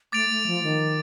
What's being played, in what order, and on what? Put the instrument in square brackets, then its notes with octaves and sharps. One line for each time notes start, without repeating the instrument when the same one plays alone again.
[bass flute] A3 [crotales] D6 A6 D7 F7
[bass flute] A3
F3
D#3